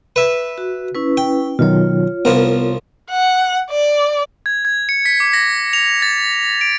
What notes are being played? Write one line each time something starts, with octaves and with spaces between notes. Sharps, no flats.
B4 E5
F#4
C#4 E4 B4
G5
B2 D#3 F#3 F4 C#5
C2 F3 B3 A#4
F#5
D5
G#6
G#6
C#7
B6
D6
A#6
F7
A6
D7